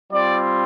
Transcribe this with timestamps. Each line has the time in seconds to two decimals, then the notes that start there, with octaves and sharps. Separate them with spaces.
0.11 G3 C4 F4 D5